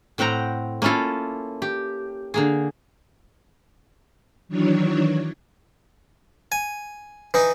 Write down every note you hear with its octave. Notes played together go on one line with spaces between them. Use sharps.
A2 C4 F#5 G5 A#5
A#3 C#4 E4 F4 A4
G4
D3 A#3 G#4
D#3 E3 F#3 D4 C#5
G#5
E3 D#4